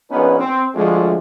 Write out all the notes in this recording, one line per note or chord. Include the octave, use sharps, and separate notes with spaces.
A#1 B3 C#4 D#4 B4
C4
D2 F3 G#3